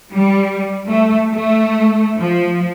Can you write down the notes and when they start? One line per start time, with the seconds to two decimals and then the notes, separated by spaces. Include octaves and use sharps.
0.13 G3
0.88 A3
1.32 A3
2.19 F3